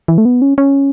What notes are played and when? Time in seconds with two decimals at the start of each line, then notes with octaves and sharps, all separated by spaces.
0.08 E3
0.18 A3
0.25 B3
0.42 C#4
0.58 C#4